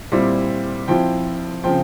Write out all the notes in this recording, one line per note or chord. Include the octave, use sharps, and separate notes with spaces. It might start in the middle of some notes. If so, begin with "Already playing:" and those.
A#2 G3 C4 E4
F3 C4 E4 G5
C#3 F3 C4 G5